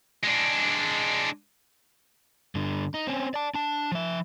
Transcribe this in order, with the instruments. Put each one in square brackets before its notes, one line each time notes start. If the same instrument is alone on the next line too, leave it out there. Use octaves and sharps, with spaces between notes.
[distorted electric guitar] G#3 D4
[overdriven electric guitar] G2 D3
D#4
C4 C#4
D5 A5
D4 A5
F3 E5